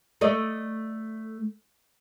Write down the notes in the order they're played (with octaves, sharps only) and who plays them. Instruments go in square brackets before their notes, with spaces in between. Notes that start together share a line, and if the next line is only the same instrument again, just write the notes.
[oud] A3 D5 D#5